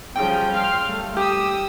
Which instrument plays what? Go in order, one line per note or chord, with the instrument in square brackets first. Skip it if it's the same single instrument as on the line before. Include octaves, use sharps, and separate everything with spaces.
[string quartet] C#3 F3 G3 [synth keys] G5
[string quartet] F5 C6 F6
G3 A3
[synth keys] G4 [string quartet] D#6 E6